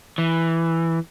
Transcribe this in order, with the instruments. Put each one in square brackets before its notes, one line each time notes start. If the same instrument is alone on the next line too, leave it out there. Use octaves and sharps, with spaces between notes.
[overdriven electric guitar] E3